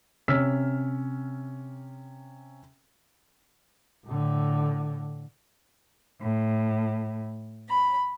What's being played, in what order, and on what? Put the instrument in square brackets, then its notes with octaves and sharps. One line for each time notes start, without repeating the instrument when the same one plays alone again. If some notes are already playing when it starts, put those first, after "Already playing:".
[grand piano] C3 C#4 E6 F6 B6
[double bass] A2 D3
[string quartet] A2
B5